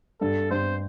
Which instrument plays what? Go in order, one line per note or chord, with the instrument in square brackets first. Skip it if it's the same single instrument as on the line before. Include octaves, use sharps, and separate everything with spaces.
[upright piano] G2 [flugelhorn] A4
[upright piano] G2 [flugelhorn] C5